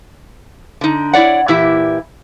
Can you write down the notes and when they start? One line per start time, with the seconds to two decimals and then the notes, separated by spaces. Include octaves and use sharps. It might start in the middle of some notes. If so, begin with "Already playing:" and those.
0.81 D3 D#4
1.13 E4 C#5 D5 F#5
1.48 A#2 E3 E4 G4 E5